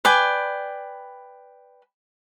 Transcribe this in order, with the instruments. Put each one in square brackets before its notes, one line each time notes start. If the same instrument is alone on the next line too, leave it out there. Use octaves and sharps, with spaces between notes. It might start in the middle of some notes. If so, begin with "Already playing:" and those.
[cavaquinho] B4 D5 G5 G#5